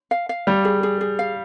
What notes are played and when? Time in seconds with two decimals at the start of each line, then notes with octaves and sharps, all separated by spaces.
0.11 F5
0.29 F5
0.47 G3 C#5
0.65 G#4
0.83 G#4
1.01 G#4
1.19 F5